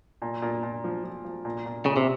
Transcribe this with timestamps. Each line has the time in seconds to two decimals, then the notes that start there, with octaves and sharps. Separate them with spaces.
0.22 A#2
0.42 A#2
0.63 A#2
0.84 F3
1.04 F3
1.25 F3
1.45 A#2
1.65 A#2
1.86 A#2 C#3
1.97 C3